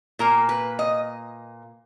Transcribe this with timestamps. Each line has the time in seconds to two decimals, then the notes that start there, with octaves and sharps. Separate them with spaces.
0.19 A#2 A#3 A#4
0.49 B4
0.79 D#5